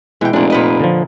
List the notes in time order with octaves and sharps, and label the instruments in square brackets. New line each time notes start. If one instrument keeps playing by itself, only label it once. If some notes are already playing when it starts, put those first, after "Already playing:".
[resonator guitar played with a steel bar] B2 G5 [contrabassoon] E3 [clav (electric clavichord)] G#3 E4
[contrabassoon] F1 [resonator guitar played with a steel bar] A#2 D4
[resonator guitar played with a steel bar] A#2 B4 D#5
[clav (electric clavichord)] D3 F3